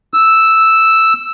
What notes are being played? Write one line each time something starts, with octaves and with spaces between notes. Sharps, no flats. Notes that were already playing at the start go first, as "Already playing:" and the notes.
E6